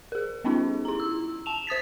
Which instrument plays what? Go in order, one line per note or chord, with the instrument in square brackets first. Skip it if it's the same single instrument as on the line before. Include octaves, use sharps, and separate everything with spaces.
[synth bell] G#4 A#4
G3 B3 C#4 D#4 F4 G#4
E4 A#5
E6
A5 E7 F7
C5 D#6 A6 B6